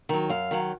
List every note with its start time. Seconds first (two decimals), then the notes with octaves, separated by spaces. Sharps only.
0.09 D#3 F#3
0.29 F#2 F5
0.51 D#3 F#3